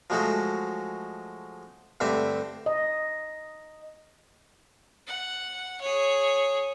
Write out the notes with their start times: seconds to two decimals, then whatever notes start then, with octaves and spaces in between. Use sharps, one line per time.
0.10 F3 F#3 G#3 A3 F#4
2.00 G2 D3 A3 C4 E5
2.66 D#5
5.07 F#5
5.81 G#4 C#5